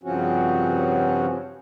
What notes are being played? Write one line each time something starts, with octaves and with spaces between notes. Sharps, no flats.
G2 C#3 F3 C4 C#4 F#4